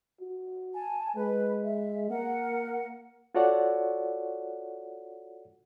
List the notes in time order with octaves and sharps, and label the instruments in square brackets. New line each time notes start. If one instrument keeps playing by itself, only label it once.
[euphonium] F#4
[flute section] G#5 A5
[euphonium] G#3 [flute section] B4
[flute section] E5
[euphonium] A#3 [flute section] A#4 F#5
[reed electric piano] F4 F#4 A4 C#5 D5 F#5